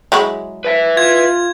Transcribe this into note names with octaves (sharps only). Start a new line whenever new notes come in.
F#3 G#3 E4
B4 E5
F4 G#6